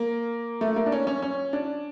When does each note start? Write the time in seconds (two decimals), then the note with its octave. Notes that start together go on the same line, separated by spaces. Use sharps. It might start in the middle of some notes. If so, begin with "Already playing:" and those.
Already playing: A#3
0.61 A3
0.76 A#3
0.86 D4
0.92 C#4
1.07 C#4
1.22 C#4
1.53 D4